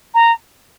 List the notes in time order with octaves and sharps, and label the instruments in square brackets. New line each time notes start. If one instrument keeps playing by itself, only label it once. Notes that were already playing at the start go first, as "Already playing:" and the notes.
[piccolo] A#5